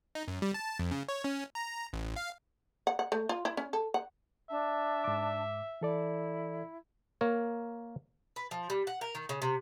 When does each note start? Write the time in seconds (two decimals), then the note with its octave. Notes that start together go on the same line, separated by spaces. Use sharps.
0.15 D#4
0.28 F#2
0.42 G3
0.54 A5
0.79 F2
0.91 C#3
1.08 C#5
1.24 C#4
1.55 A#5
1.93 A1
2.16 F5
2.87 F#5
2.99 F#5
3.12 A3
3.29 F4
3.45 E4
3.57 C#4
3.73 A4
3.94 F#5
4.49 D4 E5 A5
5.04 G#2 D6
5.81 E3 E4 A4 D5
7.21 A#3 A#4 C#5
8.36 B4
8.51 F3
8.70 G3
8.87 F#5
9.01 A#4
9.15 D#3
9.29 C#3
9.42 C3